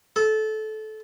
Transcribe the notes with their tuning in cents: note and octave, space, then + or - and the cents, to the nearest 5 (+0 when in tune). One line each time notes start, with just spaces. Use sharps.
A4 -20